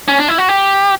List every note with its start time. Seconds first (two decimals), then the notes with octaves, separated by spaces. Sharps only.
0.08 C#4
0.19 D4
0.28 E4
0.38 F#4
0.49 G4